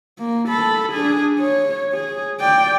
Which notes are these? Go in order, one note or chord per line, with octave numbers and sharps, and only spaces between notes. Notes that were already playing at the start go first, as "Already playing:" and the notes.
A#3
A4 B5
D4 G#4
C#5
G#4
D5 G5